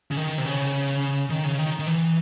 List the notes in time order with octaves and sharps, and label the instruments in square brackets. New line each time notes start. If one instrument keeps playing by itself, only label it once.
[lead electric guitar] C#3
D#3
C3
C#3
D#3
C#3
D#3
D#3
E3